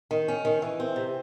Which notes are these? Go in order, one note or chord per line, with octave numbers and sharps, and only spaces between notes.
D#3
C#4
D#3
E3
C4
C3